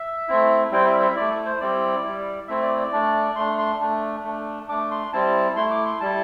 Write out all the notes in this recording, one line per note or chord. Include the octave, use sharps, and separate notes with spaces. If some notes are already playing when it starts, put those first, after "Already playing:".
Already playing: E5
A3 C4 E4
G3 C4 E4 G5
E5
E5
A3 E4 D5
A4
C5
G3 C4 E4 D5
G3 E4
A3 C4 E4 E5
D5
D5
A3 D4
A3 D4 C6
C6
A3 D4
A3 D4
A3 D4 D6
C6
G3 C4 E4 A5
A3 E4 C6
D6
C6
G3 E4 A5